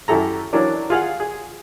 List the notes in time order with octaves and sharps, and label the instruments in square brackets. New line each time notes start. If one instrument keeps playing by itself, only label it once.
[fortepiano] F#2 E4 G4 A4 A#5
E3 F#3 C#4 D4 A#4 D5
F4 G#4 F5 F#5
G#4